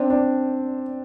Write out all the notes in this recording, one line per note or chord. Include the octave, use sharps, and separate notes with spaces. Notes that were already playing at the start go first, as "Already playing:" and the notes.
Already playing: C4 D4
D4